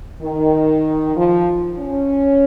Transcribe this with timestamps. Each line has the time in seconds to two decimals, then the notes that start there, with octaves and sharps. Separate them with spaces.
0.22 D#3
1.16 F3
1.78 C#4